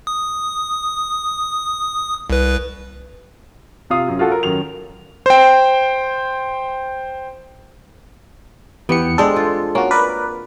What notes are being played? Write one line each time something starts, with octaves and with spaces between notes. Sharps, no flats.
D#6
C2 B4
C3 F4 F5 D#6
F#2
F4 F#4 A4
A#4
F#2 D#3 F7
C5 G5
E2 E3 B3 G4 C#7
G#3 C4 D4 A4
F4
A#3 C#4 F#4
A#4 B4 D5